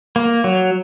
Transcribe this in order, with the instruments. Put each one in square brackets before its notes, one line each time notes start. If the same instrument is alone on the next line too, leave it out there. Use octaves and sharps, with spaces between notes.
[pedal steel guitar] A#3
F#3